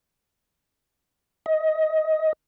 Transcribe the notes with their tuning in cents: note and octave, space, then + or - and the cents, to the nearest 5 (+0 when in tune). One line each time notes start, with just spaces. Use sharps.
D#5 +20